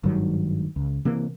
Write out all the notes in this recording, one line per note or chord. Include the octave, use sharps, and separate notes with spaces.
G#1 G2 D#3 F#3
C#2
C3 E3 A#3